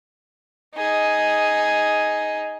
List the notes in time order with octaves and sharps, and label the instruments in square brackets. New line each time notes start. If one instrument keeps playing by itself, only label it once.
[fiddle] D#4 G#4